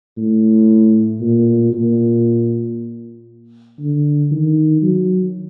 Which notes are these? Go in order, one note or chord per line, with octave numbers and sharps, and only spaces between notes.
A2
A#2
A#2
D3
D#3
F#3